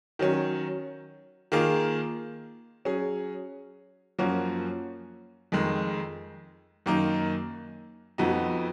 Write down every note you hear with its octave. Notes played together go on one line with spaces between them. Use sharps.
D#3 F#3 C#4
D#3 A#3 F4 G#4
F#3 C#4 G#4
F#2 F3 A#3 C#4 F#4
F2 D#3 G#3
F#2 D#3 A#3 D#4
F2 F3 B3 D#4 F#4